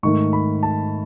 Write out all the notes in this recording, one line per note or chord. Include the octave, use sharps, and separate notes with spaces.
G#2 D#3 A3 C#6
B5
A5